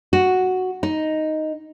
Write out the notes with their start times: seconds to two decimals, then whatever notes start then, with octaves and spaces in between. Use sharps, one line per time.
0.13 F#4
0.83 D#4